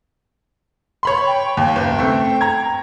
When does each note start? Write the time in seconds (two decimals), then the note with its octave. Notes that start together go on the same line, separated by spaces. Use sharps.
1.03 C#5 B5 C6
1.26 G5
1.57 D#2 G5
1.76 F#1
1.99 A3 C4
2.41 A#5 G#6